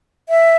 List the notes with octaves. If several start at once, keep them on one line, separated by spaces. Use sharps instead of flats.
E5